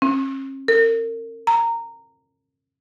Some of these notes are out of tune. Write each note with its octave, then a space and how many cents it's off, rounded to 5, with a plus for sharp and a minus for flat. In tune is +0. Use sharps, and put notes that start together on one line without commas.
C#4 -45
A#4 -35
A#5 -15